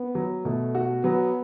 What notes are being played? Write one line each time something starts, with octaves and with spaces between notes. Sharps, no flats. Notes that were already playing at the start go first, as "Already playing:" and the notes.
Already playing: B3
F#3
B2 A3
F#4
F#3 B3